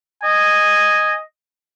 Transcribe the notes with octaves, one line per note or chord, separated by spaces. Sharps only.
D#5 G#5